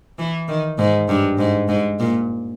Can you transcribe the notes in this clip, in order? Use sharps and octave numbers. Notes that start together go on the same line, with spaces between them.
E3
D#3
G#2
G2
G#2
G#2
A#2